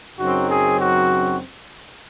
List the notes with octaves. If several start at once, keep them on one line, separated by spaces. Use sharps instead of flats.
F#2 C#3 F#3 C4 D#4 F#4
G#4
F#4